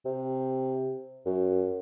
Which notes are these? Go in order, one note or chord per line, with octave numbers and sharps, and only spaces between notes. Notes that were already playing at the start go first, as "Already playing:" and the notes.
C3
F#2